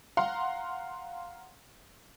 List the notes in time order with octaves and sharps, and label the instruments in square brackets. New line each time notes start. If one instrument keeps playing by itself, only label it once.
[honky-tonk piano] F5 F#5 A#5 C6